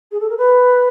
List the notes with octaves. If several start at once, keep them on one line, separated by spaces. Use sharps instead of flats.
G#4
A4
A#4
B4